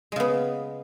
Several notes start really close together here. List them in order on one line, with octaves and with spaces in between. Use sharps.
G#3 C#3 B3